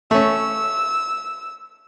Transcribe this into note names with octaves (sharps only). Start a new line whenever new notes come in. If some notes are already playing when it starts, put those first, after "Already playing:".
A3 C#4 E6